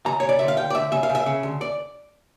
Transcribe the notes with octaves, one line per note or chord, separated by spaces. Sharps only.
C#3 A#5
C#3 C#5
D5
D2 E5
F5
D2 G5
D5
D2 E5
C#3 E5
F5
C#3
E5
C#3
D2
D5